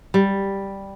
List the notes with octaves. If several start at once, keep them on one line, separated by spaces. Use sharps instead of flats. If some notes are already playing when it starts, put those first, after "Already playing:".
G3